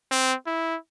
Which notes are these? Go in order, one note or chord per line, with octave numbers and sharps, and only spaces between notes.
C4
E4